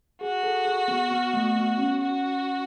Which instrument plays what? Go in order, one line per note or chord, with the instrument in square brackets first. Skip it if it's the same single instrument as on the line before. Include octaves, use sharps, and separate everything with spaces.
[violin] F#4 [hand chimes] G#4
[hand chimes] A4
G#4
B3
B3
A3
B3
C#4
[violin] F#4